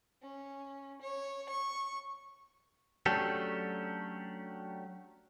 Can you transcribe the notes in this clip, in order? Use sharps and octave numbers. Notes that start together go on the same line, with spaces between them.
C#4
C#5
C#6
F#3 A3 C#4 D4 G4 A4